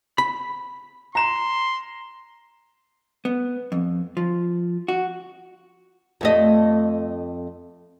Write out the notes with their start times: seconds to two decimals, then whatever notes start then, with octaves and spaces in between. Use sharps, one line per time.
0.18 B5
1.15 A#5 C6 E7
3.25 B3
3.72 F2
4.17 F3
4.88 F#4
6.21 F2 A3 D#5